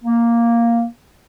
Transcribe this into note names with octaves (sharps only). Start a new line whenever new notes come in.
A#3